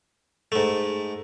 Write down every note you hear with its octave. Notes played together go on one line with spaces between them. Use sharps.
G#2 A3